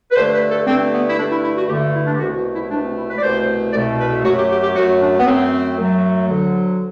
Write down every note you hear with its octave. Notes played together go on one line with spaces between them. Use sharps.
B4
G2 D3 A3 C5
B4
A4
G2 D3 A3 C4
B3
E4
G2 D3 A3 D4
E4
E4
F#4
G2 D3 A3 G4
F#4
E4
D4
G4
C2 B2 A3 F#4
F#4
E4
C2 B2 A3 D4
C4
E4
B4
D5
C2 B2 A3 C5
C2 B2 A3 D5
B4
A4
F#2 F#3 A3 F#4
G4
G4
G4
F#2 F#3 A3 F#4
D4
B3
F#2 F#3 A3 C4
F#2 F#3 A3
D2 D3 F#3